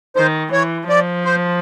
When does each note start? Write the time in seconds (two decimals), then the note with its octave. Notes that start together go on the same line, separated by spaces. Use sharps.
0.16 D#3 C5
0.52 E3 C#5
0.89 F3 D5
1.25 C5